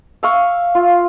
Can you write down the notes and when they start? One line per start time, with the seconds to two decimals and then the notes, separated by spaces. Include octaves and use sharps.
0.23 E5 F5 C#6
0.75 F4